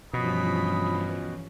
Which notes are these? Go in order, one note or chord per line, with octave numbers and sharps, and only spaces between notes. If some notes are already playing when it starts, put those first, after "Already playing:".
G2 B2 E3 F3 C#4 B5 D#6